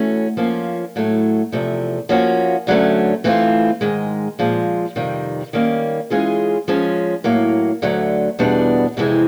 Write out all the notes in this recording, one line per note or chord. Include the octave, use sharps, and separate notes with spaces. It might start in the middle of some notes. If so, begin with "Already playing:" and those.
Already playing: E3 A3 C#4 F#4
F3 A#3 C#4 F4
A2 F#3 A3
E2 C3 F3 A3
F3 A#3 C#4 F#4
D2 D3 F#3 A3 C#4
E3 A3 C4 F4
G#2 D#3 G#3
A#2 F3 G#3
F2 C3 D#3 G3
D#3 G3 A#3 C#4
E3 G#3 C#4 F4 G#4
F3 G#3 C#4
A2 F#3 A#3
D2 D3 F#3 A3
E2 B2 G3 B3 D4
F2 C3 E3 G#3 C4